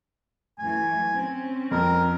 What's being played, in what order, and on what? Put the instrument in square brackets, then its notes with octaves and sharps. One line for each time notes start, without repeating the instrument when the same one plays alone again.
[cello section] F#2 E3 A3 [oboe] G#5
[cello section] C4 C#4
[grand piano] F2 [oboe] A#4